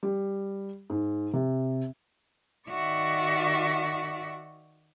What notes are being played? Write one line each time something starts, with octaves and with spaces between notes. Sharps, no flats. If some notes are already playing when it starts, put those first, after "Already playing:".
G3
G#2
C3
D#3 F#4 D5 E5 C#6